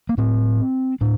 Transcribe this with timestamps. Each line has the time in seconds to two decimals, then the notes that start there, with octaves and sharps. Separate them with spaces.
0.09 A#3
0.18 A2 C4
1.01 A2 D4